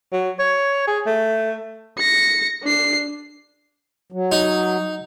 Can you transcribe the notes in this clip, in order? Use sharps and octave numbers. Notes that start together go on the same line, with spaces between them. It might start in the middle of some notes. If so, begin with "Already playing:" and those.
F#3
C#5
G#4
A3
A#6 C#7
D4 C7
F#3
D#4